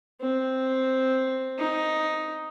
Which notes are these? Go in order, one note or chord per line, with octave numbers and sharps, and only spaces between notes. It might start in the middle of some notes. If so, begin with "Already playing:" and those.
C4
D#4